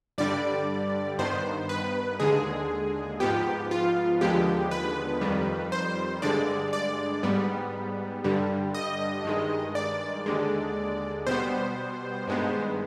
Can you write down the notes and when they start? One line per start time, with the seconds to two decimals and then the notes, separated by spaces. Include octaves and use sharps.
0.18 G2 D3 G3 D5
1.19 G2 D#3 B3 C5
1.69 B4
2.20 D#2 D3 G#3 G#4
3.20 G#2 F3 B3 G4
3.71 F4
4.21 D#2 D3 F3 G#3 B3 G4
4.71 B4
5.21 F2 D#3 G3
5.72 C5
6.22 G2 D3 G#3 D5
6.73 D5
7.23 G#2 G3 B3
8.24 G2 D3 G3
8.74 D#5
9.25 G2 D#3 G#3
9.75 D5
10.26 D#2 D3 G#3
11.27 B2 G3 B3 C5
12.27 G2 D#3 G#3 B3